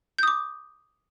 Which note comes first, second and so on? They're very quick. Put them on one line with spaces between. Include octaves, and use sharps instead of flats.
G6 D#6 D6